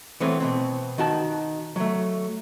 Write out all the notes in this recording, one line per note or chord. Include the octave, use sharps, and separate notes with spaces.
E3 A3 B3 C4 C#5
B2 B3 C4
D#3 F#4 A5
F#3 A3